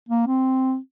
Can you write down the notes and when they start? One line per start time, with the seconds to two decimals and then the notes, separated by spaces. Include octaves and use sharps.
0.09 A#3
0.27 C4